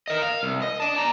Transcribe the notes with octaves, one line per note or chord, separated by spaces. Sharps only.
A#4 D#5
F5
C2
D#5
D5 A5
D5 A#5